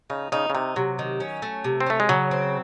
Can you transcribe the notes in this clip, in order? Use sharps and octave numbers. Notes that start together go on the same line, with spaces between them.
C#3 D#4
C#3 D#4
C#3
C3 D#4
C3 F#3
D#3
C#4
A3
C3
C4
A3 C#4
G#3
C#3 F#3
C4